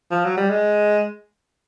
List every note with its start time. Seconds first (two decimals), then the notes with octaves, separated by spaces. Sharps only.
0.11 F3
0.25 F#3
0.37 G3
0.50 G#3